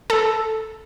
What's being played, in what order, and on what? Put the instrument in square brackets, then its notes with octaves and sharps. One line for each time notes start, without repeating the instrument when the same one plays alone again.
[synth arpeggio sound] A4